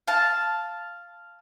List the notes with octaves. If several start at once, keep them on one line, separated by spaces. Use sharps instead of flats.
F5 A5